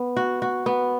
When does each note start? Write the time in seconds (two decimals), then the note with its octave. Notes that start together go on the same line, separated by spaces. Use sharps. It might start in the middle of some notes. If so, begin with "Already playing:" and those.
Already playing: B3
0.17 F#4
0.42 F#4
0.66 B3